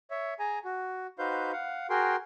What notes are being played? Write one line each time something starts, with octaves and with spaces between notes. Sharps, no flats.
C#5 E5
G#4 G#5 A#5
F#4
D#4 F#4 B4 C5 F5 G6
F5 F#5
F#4 G#4 A#4 G5 C6